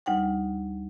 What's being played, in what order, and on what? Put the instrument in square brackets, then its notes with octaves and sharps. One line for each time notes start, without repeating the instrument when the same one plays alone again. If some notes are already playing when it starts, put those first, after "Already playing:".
[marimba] D2 G3 D#4 F#5 G5